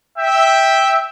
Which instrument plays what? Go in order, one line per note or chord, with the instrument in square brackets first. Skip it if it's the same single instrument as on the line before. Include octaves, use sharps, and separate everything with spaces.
[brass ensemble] E5 G5